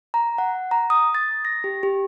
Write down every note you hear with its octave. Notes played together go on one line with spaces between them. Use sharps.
A#5
F#5
A#5
D#6
A6
A#6
G4
G4